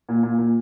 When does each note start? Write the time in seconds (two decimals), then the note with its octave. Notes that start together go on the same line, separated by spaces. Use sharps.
0.09 A#2
0.23 A#2
0.38 A#2